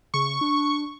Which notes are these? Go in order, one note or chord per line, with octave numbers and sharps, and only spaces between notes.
C#3 C#6
D4